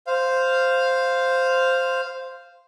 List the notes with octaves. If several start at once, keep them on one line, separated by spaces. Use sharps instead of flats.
C5 F5